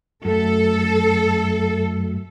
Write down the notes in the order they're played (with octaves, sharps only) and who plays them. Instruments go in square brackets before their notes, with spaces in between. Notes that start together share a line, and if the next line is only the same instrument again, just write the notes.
[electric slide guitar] F#2 A3 [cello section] A4